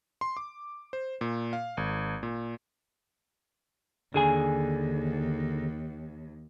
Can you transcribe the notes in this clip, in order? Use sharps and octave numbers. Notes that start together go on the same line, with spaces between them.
C6
D6
C5
A#2
F5
G#1
A#2
D#2 D3 G#4 G#5